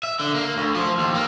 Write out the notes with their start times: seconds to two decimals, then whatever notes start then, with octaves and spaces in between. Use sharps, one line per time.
0.03 E5
0.20 D3
0.35 A#3
0.57 D2
0.75 F3
0.98 D#2
1.15 A#3